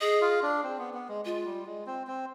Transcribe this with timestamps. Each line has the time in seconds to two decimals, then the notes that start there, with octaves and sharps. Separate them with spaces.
0.01 G#4 D#5
0.22 F4
0.43 D4
0.63 C4
0.78 B3
0.94 B3
1.09 G#3
1.25 G#3 F4
1.46 G3
1.66 G#3
1.86 C4
2.07 C4